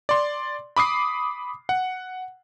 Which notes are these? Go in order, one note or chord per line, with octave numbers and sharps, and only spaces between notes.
D5 C6
B5 D6 D#6 C7
F#5